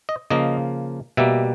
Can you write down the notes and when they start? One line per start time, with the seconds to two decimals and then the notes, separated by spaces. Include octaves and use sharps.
0.09 D#5
0.30 C#3 F3 A#3 D#5
1.17 B2 G3 A#3 E5